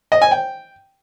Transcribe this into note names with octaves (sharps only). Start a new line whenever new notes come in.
D#5
G#5
G5